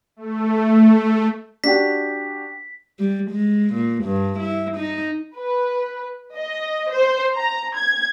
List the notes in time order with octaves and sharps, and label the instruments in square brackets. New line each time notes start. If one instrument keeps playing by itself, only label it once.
[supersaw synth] A3
[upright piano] D4 F#4 G4 [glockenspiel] B6
[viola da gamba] G3
G#3
A#2
G2
E4
D#4
[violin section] B4
D#5
C5
A#5
G#6